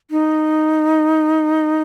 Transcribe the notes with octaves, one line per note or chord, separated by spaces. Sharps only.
D#4